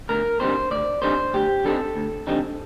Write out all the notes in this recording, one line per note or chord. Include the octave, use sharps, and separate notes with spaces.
D2 A#4
D3 G3 C4 D#4 C5
D2 D5
D3 G3 C4 D#4 C5
D2 G4
D3 G3 C4 D#4 A4
D2
D3 G3 C4 D#4